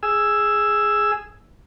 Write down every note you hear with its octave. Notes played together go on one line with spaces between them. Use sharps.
G#4 E6